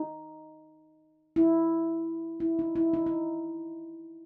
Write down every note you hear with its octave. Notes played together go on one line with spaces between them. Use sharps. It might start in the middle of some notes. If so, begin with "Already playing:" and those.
Already playing: D#4
E4
E4
D#4
E4
D#4
D#4